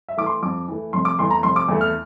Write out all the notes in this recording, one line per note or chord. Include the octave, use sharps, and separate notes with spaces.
E5
E3 A3 D6
C6
F2 D6
E3 A3
F1 C6
D6
E2 E3 A3 C6
A#5
F1 C6
D6
E2 E3 A3
F6